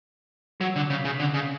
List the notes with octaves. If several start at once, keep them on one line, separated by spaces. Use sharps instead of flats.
F#3
D3
C#3
C#3
D3
C#3